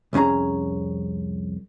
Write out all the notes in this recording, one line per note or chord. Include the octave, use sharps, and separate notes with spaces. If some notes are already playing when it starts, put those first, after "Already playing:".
C2 F2 C#4 G#4 A#5